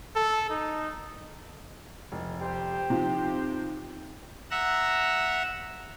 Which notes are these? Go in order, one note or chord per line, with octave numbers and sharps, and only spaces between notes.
A4
D#4
F1
G4 C5
C3 F3 D#4
E5 F#5 A#5 E6